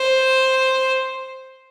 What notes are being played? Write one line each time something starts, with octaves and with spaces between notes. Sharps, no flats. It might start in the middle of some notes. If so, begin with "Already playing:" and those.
Already playing: C5